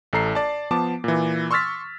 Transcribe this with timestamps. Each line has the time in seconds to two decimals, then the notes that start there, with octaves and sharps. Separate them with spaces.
0.13 A1 A4 A#5 C7
0.35 D5 A5
0.71 F3 B3 A5 D6
1.04 A#2 E3
1.51 C6 C#6 E6 F6 A6 B6